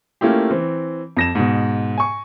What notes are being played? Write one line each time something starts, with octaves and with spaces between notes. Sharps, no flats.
A3 A#3 C#4 E4 F4 G4
E3 C4
F2 A#6 E7
G#2 B2
G#5 C#6